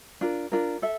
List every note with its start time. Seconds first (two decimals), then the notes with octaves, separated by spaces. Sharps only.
0.21 D4 F4 A#4
0.52 D4 F4 A#4
0.82 A4 E5